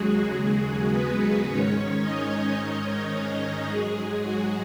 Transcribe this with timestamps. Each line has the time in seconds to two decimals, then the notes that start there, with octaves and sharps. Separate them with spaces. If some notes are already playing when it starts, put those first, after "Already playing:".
Already playing: D#2 C#3 F#3 G#3 F#4 G#4
0.35 F#4
0.90 B3 B4
1.46 G#2 D#3 G#3 C#4 C#5
2.01 D#4 D#5
2.56 C#4 C#5
3.66 G#2 F#3 G#3 G#4
4.22 F#4